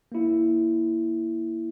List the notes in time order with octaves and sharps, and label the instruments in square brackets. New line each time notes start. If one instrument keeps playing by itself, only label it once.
[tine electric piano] A#3 E4